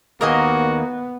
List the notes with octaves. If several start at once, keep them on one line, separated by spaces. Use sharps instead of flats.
D#2 A#3 B3 F#4 A#4 D#5 G#5